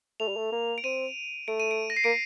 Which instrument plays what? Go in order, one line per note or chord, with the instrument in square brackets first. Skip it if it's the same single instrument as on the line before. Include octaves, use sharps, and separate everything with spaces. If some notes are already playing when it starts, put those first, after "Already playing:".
[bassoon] A3 [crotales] F7
[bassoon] G3
A3
A#3
[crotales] D7
[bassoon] C4 [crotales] D#7
[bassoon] A3 [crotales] D7
[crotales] D#7
D7
A#6
C7
[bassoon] A#3 [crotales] D7